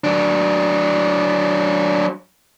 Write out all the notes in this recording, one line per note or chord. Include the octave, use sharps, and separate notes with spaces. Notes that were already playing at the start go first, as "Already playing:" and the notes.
F#3 D4